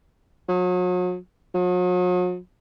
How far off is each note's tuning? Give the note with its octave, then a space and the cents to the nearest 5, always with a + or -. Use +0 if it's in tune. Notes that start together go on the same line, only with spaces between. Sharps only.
F#3 -40
F#3 -45